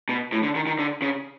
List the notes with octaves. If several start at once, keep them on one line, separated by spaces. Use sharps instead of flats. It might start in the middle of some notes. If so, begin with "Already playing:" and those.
B2
A2
D3
D#3
D#3
D3
C#3